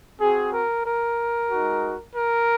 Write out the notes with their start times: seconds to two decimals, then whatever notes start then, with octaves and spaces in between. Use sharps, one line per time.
0.20 C4 F#4 G#4
0.51 A#4
0.85 A#4
1.50 G#3 D#4 F#4
2.16 A#4